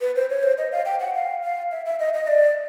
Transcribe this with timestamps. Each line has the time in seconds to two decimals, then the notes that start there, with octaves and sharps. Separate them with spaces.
0.01 B4
0.16 C5
0.30 C#5
0.43 C5
0.58 D#5
0.72 F5
0.85 G5
1.00 F#5
1.15 F5
1.42 F5
1.71 E5
1.86 E5
1.99 D#5
2.14 D#5
2.27 D5